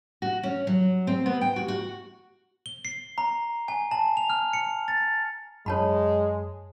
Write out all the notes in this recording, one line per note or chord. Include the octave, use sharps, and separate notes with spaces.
F#4
C#4
F#3
C4
B3
G5
F#4
F#4
G7
C7
A#5
G#5
A5
F7
F6
C#7
A6
F#2 G#3 C#5 A5 B5